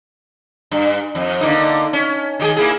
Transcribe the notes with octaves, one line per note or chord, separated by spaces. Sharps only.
G2
F2
D3 A#3 D#4
C#4
D#3 G4 G#4
A#3 E4 G#4